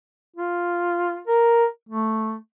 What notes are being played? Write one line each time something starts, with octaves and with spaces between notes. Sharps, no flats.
F4
A#4
A3